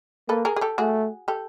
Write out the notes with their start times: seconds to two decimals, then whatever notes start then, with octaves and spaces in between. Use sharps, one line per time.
0.29 A#3 A4 B4
0.45 G#4 A#4
0.56 G#4
0.61 G4 A4
0.78 A3 F#4 G#4
1.28 G4 A4